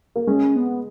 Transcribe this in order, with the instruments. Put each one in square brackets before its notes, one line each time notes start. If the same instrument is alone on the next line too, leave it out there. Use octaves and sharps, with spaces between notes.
[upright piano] A#3
[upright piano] G#3 [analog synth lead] C#4
[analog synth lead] B3